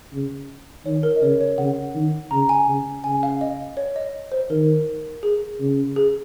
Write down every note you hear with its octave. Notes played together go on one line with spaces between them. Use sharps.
C#3
D#3 C#5
A#4
D#5
C#3 C#5
C#5
C#3 F#5
D#3
C#3 A#5
G#5
C#3
C#3 G#5
F5
D#5
C#5
D#5
C5
D#3 A#4
G#4
C#3
G#4